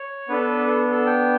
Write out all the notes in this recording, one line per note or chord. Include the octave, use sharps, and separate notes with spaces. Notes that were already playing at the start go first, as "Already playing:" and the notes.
Already playing: C#5
B3 D4 A4 B4
A4
A4
G5